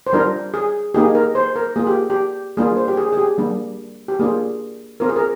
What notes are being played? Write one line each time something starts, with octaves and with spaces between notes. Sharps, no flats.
C5
G3 D4 F4 A#4
G#4
A#3 D#4 G4 G#4
A#4
C5
A#4
A#3 F4 G#4
G4
G4
G3 A#3 D4 F4 G#4
C5
G4
G#4
G#4
G4
G3 A#3 D4
G4
A#3 D4 F4 G#4
C4 F4 A#4
G#4
A#4